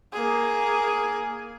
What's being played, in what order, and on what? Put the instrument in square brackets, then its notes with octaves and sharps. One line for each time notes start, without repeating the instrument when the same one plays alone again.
[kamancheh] A#3 G#4